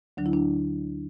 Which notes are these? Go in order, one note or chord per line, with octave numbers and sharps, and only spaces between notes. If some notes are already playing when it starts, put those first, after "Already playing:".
D2 D3 F#3 D4
E4
D4